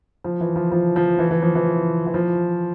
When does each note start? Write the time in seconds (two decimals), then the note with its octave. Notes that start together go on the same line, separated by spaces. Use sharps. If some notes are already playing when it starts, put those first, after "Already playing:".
0.24 F3
0.40 E3
0.56 F3
0.72 F3
0.96 F3
1.19 E3
1.31 E3
1.42 F3
1.55 E3
2.06 E3
2.14 F3